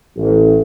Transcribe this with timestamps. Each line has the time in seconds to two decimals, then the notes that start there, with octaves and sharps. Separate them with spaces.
0.17 A1